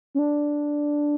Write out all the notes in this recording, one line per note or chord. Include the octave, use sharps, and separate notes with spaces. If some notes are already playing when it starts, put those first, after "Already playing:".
C#4
D4